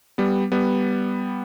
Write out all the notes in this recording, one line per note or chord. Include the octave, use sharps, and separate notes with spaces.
G3 B3
G3 B3